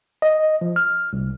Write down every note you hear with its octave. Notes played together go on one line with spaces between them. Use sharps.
D#5
F3
F6
C2